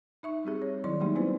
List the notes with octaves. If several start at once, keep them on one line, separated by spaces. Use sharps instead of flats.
D#4 E5 C#6
G3 C4 G4 G#4
C#5
D#3 F#3 E4 D5 C6
F#3 G3 A3 A#3 D#4 G4
B3 C4 E4 F4 B4 C5